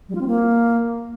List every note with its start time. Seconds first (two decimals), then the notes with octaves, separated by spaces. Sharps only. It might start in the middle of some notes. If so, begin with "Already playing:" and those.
0.09 G3
0.15 F4
0.21 C4
0.27 A#3